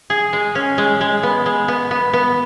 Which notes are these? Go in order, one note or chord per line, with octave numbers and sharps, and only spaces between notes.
G#4
G#3
C#4
G#3
G#3
B3
G#3
B3
B3
B3